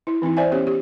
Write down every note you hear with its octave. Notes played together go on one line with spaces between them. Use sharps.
E4
E3 C4 D#4 E4
C5 D5 E5 G#5
B3 C#4 G4 C#5
G4